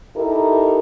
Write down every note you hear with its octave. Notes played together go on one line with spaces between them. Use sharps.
D#4 E4 G4 A4 A#4